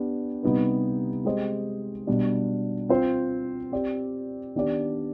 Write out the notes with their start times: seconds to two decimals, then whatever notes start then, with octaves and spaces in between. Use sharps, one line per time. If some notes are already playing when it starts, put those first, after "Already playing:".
Already playing: B3 D4 G4
0.43 C3 G3 B3 D#4 B4
1.25 G#3 C4 G4 C5 D#5
2.07 B2 G3 D4
2.89 C4 F4 C5
3.72 C4 G4 D5
4.55 D#3 B3 D4 G4 D5